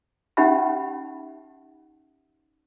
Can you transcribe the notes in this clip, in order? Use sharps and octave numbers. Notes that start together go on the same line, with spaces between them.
C#4 D#4 G4 E5 F#5 B5